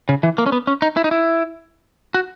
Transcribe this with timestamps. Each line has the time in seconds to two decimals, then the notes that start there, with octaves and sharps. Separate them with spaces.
0.09 C#3
0.23 E3
0.38 A#3
0.46 C#4
0.52 B3
0.67 C#4
0.82 D#4
0.97 E4
1.04 D#4
1.11 E4
2.14 F#4